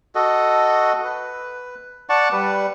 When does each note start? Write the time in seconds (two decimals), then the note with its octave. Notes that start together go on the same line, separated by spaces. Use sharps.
0.15 F#4 A4 D#5
1.04 B4
2.09 D5 F#5 A5 C#6
2.32 G3 B4